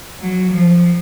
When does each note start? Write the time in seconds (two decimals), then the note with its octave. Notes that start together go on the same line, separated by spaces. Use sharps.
0.21 F#3
0.51 F3